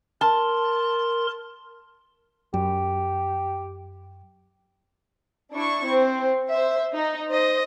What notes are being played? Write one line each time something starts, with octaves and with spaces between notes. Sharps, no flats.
A#4 A5 C6
F#2 G4
D4 E4 C#6
C4
C5 E5
D#4
C5 D#5